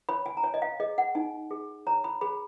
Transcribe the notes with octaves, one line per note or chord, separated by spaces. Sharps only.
C#5 B5
G#5
A#5
C#5 G#5
D#5
F5
G#4 D#5
F#5
D#4 G#5
G#4
C#5 A#5
B5
G#4 B5